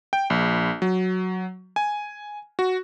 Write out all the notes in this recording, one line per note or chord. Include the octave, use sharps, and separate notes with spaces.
G5
A#1
F#3
G#5
F#4